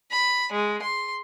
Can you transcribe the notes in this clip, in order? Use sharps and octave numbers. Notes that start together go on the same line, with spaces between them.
B5
G#3
C6